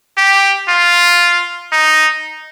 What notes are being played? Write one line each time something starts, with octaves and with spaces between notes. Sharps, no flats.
G4
F4
D#4